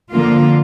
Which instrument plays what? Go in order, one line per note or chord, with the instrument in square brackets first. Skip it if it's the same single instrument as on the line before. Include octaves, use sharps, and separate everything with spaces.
[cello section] F2 D3 F3 A#3 F4